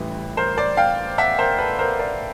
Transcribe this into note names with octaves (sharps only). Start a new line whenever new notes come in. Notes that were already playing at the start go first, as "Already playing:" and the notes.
Already playing: A1 A2 E3 G3 B4
A#4 C5
C5 D5
F5 G5
E5 F#5
A#4 C5
A4 B4
A#4 C5
C5 D5